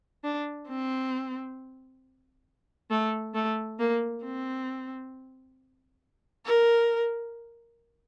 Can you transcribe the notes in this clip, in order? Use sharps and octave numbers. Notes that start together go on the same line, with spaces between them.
D4
C4
A3
A3
A#3
C4
A#4